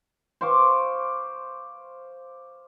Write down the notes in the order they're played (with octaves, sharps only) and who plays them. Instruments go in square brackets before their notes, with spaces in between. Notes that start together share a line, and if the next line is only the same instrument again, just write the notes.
[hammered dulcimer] C5 F5 C#6 D6